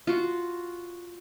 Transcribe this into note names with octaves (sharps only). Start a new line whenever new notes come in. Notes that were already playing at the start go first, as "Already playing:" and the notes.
F4 F#4